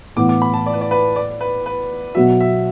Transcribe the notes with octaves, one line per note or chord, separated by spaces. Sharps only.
A2 E3 B3 E4 D6
D6
B5
A5
D5
B4
D5
B4
D5
B4
B4
B2 F#3 B3 F#4 E5
E5